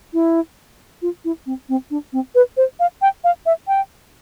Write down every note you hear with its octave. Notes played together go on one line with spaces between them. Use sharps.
E4
F4
E4
C4
C4
D4
C4
B4
C5
F5
G5
F5
E5
G5